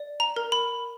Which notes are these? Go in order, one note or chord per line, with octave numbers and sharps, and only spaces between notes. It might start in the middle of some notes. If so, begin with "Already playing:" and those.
Already playing: D5
A#5
A#4
B5